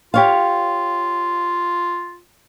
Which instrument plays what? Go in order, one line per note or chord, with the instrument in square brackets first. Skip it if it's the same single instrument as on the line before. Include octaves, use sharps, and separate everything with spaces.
[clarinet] F4 [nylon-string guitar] G4 C#5 F5